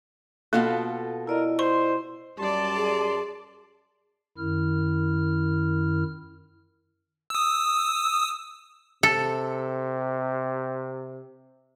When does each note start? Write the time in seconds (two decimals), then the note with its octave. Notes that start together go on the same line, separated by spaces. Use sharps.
0.53 B2 A#3 F4 A4
1.27 E4 A#4 D5 D#5
1.59 C5 C6 C#6
2.39 F#2 G3 D5 A5 C6
2.76 G#4
4.38 F#2 D#3 E4 F6
7.30 D#6 E6
9.03 C3 A4